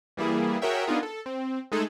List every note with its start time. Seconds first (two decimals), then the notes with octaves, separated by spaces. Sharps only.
0.17 E3 G3 A#3 E4 G#4
0.62 F#4 G#4 A#4 C#5 E5 G5
0.86 B3 D4 D#4 F4 G#4 A#4
1.03 A4
1.26 C4
1.72 G#3 A3 D#4 G#4 A4